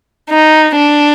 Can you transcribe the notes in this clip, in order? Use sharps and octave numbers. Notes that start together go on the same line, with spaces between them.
D#4
D4